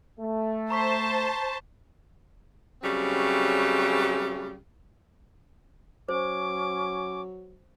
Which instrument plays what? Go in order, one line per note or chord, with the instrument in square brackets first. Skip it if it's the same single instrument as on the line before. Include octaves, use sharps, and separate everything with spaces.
[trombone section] A3
[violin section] C5 A5 [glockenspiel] A#5 C#6 B6
[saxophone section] C#3 F#3 G3 A3 C4
[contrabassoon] F#3 [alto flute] C#4 [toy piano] C5 [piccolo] D6